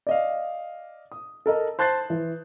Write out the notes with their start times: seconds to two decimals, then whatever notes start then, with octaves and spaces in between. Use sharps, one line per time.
0.07 D5 D#5 F5
1.12 D#6
1.46 A4 A#4 D#5 A#5
1.79 C5 A5 F#6 G6 A6 C7
2.10 E3